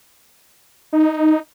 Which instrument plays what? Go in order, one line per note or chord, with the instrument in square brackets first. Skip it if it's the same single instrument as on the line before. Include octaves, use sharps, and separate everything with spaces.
[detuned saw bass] D#4